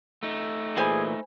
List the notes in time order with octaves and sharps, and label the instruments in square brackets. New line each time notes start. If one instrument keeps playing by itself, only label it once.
[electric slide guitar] A3 D#4
[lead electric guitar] A#2 E3 [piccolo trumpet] G#4 [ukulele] C5 G#5 B5